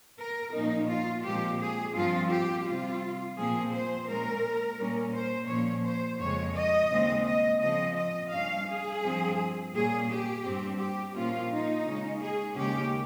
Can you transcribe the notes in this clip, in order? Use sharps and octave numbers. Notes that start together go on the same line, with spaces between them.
A#4
A#2 F3 A#3 C#4 D#4
F4
A#2 F3 G#3 C4 G4
G#4
G2 F3 C4 F4
G4
C3 G3 C4 F4
A#2 F3 C4 G#4
C5
A#2 G#3 C#4 A#4
A#2 G3 C#4
C5
A#2 F3 A#3 C#4 C#5
C5
F2 C#3 G#3 C#5
D#5
D#2 C#3 G#3 C4
D#5
C#3 F3 C4 D#5
D#5
G2 G3 C#4 F5
G#4
G2 F3 C4
A#2 G3 C#4 G#4
G4
G2 G3 C4
G4
A#2 F3 A#3 C#4 F4
D#4
C#3 G#3 C#4
G#4
D#2 C#3 G#3 C#4 G4